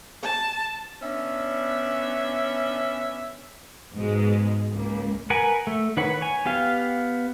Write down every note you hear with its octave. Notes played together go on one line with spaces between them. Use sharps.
A5
B3 C#4 D4 E5
G#2 B2 G#3
C#2 A#3
A#4 B4 F#5 G#5
A3
D#3 B4 C#5 F#5 B5
C#5 G#5
B3 G4 F5